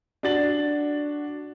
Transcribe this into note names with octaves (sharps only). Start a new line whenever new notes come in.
D4 F#4 A6 F#7